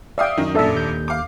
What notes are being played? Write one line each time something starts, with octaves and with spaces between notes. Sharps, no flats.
D5 E5 F5 G5 D#6
F#2 D#3 D#4
F1 A#2 D4 A4 E5
D#2 G6
F5 D6